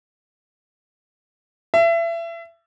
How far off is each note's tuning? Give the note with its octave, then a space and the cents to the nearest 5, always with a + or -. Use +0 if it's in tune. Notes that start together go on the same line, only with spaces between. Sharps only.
E5 +30